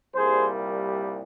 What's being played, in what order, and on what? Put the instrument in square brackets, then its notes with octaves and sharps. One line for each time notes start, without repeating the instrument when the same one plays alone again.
[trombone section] C2 A#2 G3 A#3 G#4 C5